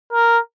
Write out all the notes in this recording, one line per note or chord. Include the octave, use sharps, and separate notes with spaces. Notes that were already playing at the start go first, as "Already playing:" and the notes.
A#4